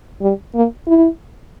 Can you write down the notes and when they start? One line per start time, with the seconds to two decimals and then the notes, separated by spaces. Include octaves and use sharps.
0.22 G3
0.55 A#3
0.87 E4